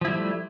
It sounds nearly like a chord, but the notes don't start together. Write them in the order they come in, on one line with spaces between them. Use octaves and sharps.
F3 E4 G3 A3